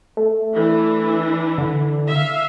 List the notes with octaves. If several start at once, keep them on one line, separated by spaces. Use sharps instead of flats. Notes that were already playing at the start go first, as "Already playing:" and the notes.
A3
E3 D4
D3
E5 F5